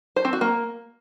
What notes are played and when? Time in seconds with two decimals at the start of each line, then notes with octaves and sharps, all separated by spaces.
0.16 C5
0.25 C4
0.33 F#4
0.41 A#3